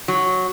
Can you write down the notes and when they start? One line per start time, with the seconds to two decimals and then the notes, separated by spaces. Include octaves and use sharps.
0.08 F#3